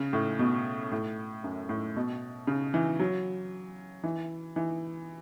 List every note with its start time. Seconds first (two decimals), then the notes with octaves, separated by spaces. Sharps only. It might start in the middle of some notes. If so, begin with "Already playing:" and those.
Already playing: C#3
0.13 A2
0.39 B2
0.92 A2
1.44 F#2
1.69 A2
1.96 B2
2.47 C#3
2.74 E3
3.00 F#3
4.04 E3
4.56 E3